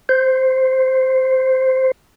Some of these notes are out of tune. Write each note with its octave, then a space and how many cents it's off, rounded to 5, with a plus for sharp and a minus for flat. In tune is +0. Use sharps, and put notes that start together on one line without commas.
C5 -5